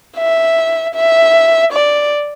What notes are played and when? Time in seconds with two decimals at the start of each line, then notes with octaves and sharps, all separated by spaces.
0.18 E5
0.95 E5
1.73 D5